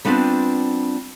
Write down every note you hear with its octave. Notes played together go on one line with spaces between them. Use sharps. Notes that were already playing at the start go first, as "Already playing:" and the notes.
G3 B3 C4 D4 F4 B4